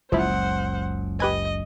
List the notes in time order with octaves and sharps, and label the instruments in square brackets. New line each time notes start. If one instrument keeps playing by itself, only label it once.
[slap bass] F#1 C#2 [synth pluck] F3 E4 [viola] C5 F#5
[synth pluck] G4 B4 G#5 [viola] D#5